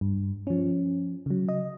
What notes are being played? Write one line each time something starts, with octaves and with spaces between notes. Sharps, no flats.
G2
F3 C#4
C#3 F#3
D#5